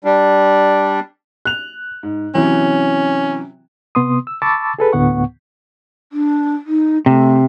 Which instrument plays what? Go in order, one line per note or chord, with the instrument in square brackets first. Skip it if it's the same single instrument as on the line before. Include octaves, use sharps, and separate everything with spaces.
[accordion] G3 D4
[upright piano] F#6 F7
G#2
[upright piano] C3 E3 F#3 [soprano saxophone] C#4
[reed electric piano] C3 B3 C6 D#6
E6
A5 B5 C#6 D6 E6 A6
G#4 A4 B4
D2 A2 B3 F#5 C#6
[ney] D4
D#4
[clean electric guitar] C3 [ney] A3